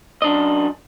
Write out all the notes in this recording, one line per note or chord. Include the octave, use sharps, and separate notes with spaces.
F#2 D4 D#5